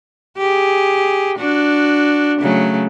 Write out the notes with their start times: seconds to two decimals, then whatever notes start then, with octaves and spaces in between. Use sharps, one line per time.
0.38 G4 G#4
1.39 D4 F#4
2.41 C#3 F#3 A3